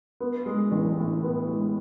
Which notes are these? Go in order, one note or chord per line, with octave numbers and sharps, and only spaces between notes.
B3
G#3
A1
A2
B3
G#3